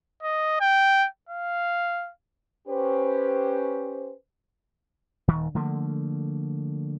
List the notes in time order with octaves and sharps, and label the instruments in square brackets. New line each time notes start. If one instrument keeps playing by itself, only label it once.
[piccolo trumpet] D#5
G5
F5
[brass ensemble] C#4 G4 B4 C5
[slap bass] D#1 D#3
D3 F3 A3 A#3